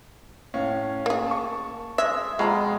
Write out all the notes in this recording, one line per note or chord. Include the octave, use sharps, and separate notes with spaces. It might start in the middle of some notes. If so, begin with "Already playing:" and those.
A2 C#4 F5
A#3 G#4
A5 C#6
G#3 E5
F2 B2 G#3 F4 A#5